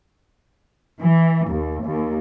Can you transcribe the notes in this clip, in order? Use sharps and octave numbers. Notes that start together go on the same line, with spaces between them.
E3
D#2
D#2